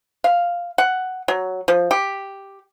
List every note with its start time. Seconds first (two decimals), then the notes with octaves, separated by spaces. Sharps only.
0.24 F5
0.78 F#5
1.28 F#3
1.68 F3
1.91 G4